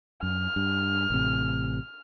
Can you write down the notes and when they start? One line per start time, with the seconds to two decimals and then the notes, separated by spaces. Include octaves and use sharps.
0.23 F#2 F6
0.56 G2
1.10 A1 A2 C3